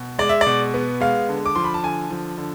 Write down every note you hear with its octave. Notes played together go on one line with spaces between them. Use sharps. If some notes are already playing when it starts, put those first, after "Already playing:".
Already playing: B2
G#3 D5
E5
D5
B2
B3
G#3 F5
D3
D6
F3 C6
B5
A5
D3 G#5
F3
D3